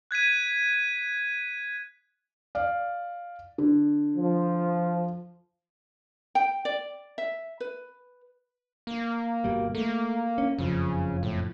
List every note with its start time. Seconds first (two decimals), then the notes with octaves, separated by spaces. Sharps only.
0.11 F#6 G#6 B6 D#7
2.55 D5 F5
3.58 D3
4.16 F3
6.35 G5
6.65 D5
7.18 E5
7.60 B4
8.87 A#3
9.44 G1 B2 G3
9.75 A3 A#3
10.38 C#4
10.58 F#1 F2 C#3 F3
11.23 A2